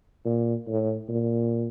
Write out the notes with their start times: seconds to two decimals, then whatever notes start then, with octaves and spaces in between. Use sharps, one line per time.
0.25 A#2
0.67 A2
1.09 A#2